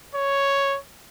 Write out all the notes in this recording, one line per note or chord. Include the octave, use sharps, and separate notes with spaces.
C#5